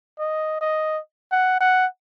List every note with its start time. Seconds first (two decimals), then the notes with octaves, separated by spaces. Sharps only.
0.19 D#5
0.61 D#5
1.32 F#5
1.61 F#5